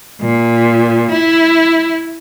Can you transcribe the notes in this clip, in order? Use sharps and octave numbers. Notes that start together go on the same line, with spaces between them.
A#2
E4